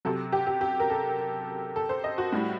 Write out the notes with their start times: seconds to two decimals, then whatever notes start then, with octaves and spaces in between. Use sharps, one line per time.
0.05 C3 F#3 A4
0.32 G4
0.47 G4
0.61 G4
0.80 A#4
0.90 A4
1.76 A4
1.89 C5
2.04 D#5
2.18 F#4
2.32 A2 G3